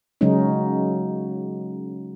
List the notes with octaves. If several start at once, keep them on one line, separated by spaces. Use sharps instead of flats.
C#3 F#3 G#3 C#4 D#4